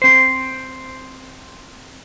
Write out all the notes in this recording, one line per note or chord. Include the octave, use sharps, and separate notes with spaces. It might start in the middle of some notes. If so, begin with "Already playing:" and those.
C4 C5